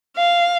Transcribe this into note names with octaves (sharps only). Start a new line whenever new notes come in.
F5